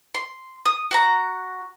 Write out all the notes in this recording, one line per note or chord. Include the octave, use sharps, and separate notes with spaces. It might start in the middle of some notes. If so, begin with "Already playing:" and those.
C6
D#6
F#4 F#5 A#5